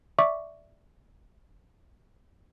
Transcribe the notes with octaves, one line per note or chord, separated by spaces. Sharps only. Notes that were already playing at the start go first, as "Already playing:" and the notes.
D5 E5 C#6 D6